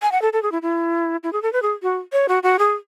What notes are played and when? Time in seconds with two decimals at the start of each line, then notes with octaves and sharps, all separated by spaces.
0.02 G#5
0.12 F#5
0.22 A4
0.33 A4
0.43 G#4
0.52 E4
0.62 E4
1.23 E4
1.33 G#4
1.42 A4
1.53 B4
1.62 G#4
1.83 F#4
2.13 C#5
2.29 F#4
2.43 F#4
2.59 G#4